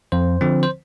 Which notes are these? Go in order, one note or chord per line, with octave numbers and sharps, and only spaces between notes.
F2 C5
D3 F3 C4
C5